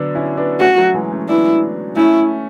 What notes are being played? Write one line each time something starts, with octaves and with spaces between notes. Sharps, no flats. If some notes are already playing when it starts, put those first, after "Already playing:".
Already playing: D3 F#3 B3 D4
C#4 E4
B3 D4
A3 C#4 F#4
F#3 A3
E3 G#3
A3 C#4
B3 D4 E4
A3 C#4 E4